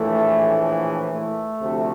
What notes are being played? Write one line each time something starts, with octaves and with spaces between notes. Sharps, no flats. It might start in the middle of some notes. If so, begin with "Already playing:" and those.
Already playing: A#1 A2 E3 A3
A3
D2 C3 F3